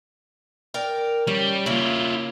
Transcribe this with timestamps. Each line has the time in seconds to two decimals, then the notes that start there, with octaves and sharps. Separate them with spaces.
0.74 A#4 D5 G5
1.27 G3 C#4
1.66 C#3 A#3 E4 F4